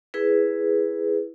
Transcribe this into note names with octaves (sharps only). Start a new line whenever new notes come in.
E4 G#4 B4